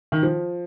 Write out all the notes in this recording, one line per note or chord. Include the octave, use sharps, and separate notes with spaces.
D#3
F3